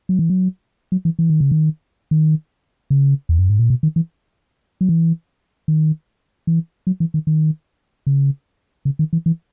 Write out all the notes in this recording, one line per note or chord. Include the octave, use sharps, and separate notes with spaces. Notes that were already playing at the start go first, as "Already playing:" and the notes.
F#3
E3
F#3
F#3
E3
E3
D#3
C#3
D#3
D#3
C#3
E2
F#2
G#2
A#2
B2
D#3
E3
F#3
E3
D#3
E3
F#3
E3
D#3
D#3
C#3
C#3
D#3
E3
E3